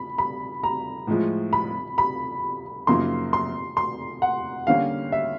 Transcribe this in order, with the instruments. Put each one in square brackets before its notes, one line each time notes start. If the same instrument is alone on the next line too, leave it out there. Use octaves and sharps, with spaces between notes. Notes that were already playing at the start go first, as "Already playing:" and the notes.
Already playing: [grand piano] B5
B5
A#5
[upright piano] A2 F3 G#3
[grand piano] B5
B5
[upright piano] F#2 C#3 F3 A#3 D#4 [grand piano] C6
[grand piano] C6
C6
F#5
[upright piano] D3 G3 A#3 C#4 [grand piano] F5
[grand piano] E5